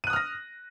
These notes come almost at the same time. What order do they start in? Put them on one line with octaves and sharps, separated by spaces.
D#7 F#6 D#6 F6 A#6